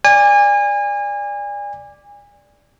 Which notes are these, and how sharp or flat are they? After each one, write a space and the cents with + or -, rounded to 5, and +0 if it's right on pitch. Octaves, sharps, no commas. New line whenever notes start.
D5 +0 G#5 -30